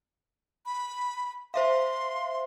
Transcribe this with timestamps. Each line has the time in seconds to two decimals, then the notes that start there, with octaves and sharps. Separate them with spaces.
0.66 B5
1.54 C5 E5 F5 C6